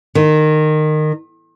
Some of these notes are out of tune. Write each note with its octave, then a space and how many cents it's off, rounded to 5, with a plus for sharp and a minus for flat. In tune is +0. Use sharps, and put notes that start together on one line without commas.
D#3 -20